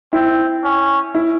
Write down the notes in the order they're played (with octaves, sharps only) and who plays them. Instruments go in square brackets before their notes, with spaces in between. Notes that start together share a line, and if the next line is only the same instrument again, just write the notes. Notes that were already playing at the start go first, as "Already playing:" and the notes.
[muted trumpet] C4 [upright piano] E4
[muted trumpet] C#4
[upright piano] E4